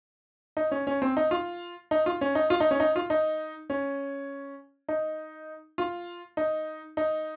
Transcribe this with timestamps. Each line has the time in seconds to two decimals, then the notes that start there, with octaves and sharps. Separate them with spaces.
0.57 D#4
0.71 C#4
0.87 C#4
1.02 C4
1.17 D#4
1.31 F4
1.91 D#4
2.06 F4
2.21 C#4
2.35 D#4
2.50 F4
2.60 D#4
2.71 C#4
2.80 D#4
2.96 F4
3.10 D#4
3.70 C#4
4.88 D#4
5.78 F4
6.37 D#4
6.97 D#4